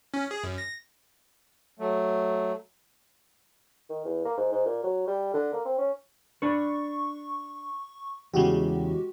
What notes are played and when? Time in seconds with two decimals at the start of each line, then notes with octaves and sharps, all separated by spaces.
0.14 C#4
0.31 G#4
0.43 F#2
0.58 A#6
1.79 F#3 A3
3.90 D#3
4.05 E2
4.25 A#3
4.37 G#2
4.52 G#2
4.66 A#2
4.83 F#3
5.07 G3
5.34 D3
5.53 A#3
5.65 C4
5.78 C#4
6.42 D4 B4 C#6
8.33 E2 C#3 G#3 F#4 G4